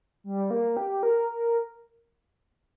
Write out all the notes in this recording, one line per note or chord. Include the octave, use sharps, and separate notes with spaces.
G3
A#3
G4
A#4
A#4